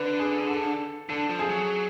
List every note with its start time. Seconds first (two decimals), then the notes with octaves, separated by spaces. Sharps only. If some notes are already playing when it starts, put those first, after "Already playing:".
Already playing: D3 B4
0.19 G#4
0.49 A4
1.09 D3 A4
1.30 F3
1.39 G#4
1.50 F#3